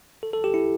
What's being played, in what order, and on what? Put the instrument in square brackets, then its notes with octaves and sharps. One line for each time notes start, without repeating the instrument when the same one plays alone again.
[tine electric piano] A4
A4
G4
E4